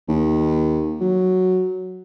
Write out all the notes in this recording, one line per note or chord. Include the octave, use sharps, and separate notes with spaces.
D#2
F#3